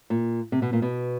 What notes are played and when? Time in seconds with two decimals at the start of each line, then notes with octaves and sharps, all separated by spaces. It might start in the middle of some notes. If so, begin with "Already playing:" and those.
0.10 A#2
0.52 C3
0.62 B2
0.73 A#2
0.82 B2